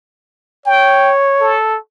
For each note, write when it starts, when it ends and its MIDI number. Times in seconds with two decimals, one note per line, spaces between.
0.66 1.57 73
0.66 1.11 79
1.40 1.77 69